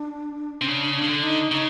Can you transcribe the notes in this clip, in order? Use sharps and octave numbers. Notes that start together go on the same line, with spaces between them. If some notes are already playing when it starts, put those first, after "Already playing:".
Already playing: D4
C3 C#4
C#3 D4
D4
C#3
D3
D#4
C#3 D#4